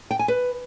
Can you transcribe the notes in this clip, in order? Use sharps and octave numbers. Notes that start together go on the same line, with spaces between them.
G5
G#5
B4